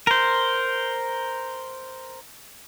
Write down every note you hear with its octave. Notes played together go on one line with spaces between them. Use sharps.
A#4 C5